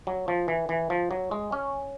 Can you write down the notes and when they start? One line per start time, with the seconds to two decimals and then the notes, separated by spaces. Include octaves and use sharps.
0.07 F#3
0.28 F3
0.48 E3
0.69 E3
0.90 F3
1.11 F#3
1.31 G#3
1.52 C#4